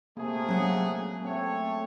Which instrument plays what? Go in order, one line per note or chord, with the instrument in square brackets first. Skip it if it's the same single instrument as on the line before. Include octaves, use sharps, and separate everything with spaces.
[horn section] C3 A3 G#4 [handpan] A#3
[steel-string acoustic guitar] F#3 G#3 F#5 [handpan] C#4
[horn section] A3 C#5 [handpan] C4